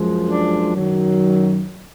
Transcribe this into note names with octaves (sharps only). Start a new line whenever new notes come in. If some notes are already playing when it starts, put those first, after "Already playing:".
Already playing: F#2 F3 G#3
D4
F#2 D#3 F#3